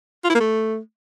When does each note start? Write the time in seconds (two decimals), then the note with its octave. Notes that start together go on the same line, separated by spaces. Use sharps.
0.24 F4
0.30 E4
0.35 A#3
0.40 A3